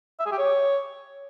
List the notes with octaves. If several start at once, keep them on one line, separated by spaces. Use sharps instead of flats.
E5
G#4
G4
C#5